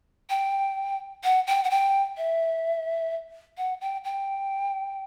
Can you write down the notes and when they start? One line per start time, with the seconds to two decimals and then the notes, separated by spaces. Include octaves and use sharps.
0.30 G5
1.24 F#5
1.47 G5
1.64 F#5
1.70 G5
2.17 E5
3.58 F#5
3.81 G5
4.05 G5